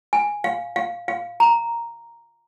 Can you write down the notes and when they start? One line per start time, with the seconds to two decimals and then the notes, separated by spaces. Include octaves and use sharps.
0.13 G#5
0.44 F5
0.76 F5
1.08 F5
1.40 A#5